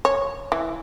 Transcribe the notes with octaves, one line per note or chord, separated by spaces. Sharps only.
C#5
E3